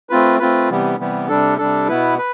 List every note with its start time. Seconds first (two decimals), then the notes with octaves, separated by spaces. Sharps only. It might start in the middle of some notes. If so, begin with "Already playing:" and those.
0.10 A3 C4 F4 B4
0.39 A3 C4 F4 B4
0.70 C3 E3 G3 B3
0.99 C3 E3 G3 B3
1.28 C3 G3 D4 A4
1.58 C3 G3 D4 A4
1.88 B2 B3 E4 B4
2.18 B4